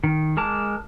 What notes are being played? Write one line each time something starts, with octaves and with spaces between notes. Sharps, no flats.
D#3
G#3 A#4 A5 D6